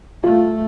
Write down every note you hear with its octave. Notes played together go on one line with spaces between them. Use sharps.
A3 F4